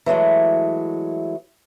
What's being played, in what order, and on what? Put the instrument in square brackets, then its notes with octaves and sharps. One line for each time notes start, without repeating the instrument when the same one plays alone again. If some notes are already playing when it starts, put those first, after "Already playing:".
[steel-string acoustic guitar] E3 F#3 G#3 A3